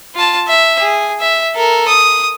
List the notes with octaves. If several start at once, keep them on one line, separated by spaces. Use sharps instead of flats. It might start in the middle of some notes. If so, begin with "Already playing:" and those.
F4 A5
E5
G#4
E5
A4 A#4
D#6